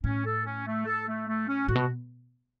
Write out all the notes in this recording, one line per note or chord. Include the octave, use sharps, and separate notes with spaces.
A2 C#4
A4
C#4
A3
A4
A3
A3
C#4
A2 F#4
B2